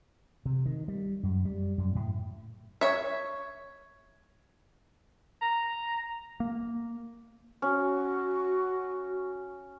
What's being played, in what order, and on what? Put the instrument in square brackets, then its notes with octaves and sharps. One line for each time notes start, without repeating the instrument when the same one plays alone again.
[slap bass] C3
D#3
G3
F#2
G3
F#2
A2
[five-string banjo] C#5 E5
[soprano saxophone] A#5
[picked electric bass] A#3
[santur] C#4 [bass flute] F#4